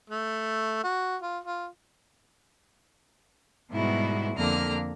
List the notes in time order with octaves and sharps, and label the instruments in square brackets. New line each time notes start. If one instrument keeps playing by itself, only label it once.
[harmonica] A3
F#4
F4
F4
[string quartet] G#2 B2 G3 B3 E4 F#4
F2 D3 A#3 A#5 F6